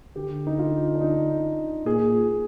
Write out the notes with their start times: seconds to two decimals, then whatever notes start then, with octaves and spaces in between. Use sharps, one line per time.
0.16 D3 G4
0.47 D#4
0.59 F4
0.95 D4
1.01 D#4
1.85 A#2 G#4